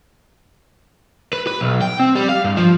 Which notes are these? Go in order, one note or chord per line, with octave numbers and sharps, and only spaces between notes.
B4
B4
B1
G5
C4
G3
F5
G2
F3